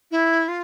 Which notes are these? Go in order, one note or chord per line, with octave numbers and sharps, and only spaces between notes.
E4
F4